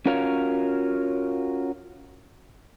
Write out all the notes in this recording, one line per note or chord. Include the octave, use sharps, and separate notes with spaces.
C#4 F4 F#4 A#4 C#5 F5